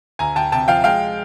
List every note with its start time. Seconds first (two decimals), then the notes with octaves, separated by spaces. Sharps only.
0.19 D2 G#5 A#5
0.36 D2 G5 A5
0.52 C3 G5 A5
0.68 F3 F5 G5
0.84 G#3 F5 G5